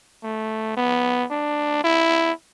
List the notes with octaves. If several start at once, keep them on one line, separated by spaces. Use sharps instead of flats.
A3
B3
D4
E4